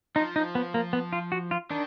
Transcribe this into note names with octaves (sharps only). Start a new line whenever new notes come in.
F3 D#4
D#4
B3
A#3
B3
F4
F#4
F4
D#3 D4